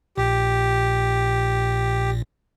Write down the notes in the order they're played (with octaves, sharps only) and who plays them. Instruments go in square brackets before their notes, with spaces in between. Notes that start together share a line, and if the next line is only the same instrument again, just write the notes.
[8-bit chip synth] A#1 A#2 [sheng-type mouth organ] G4